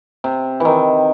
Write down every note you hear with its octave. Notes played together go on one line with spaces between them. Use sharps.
C3
D#3 E3